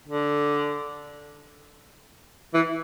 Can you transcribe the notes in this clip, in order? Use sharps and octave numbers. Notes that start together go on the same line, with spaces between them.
D3
E3